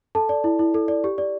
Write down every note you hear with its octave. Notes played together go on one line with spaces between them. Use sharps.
A4 A5
D5
E4
E4
A4
D5
G4
D5